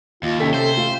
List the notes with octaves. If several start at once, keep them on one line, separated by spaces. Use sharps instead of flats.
D#2 F4
C3 C#4 A4 G5 B6
C5
A3 F4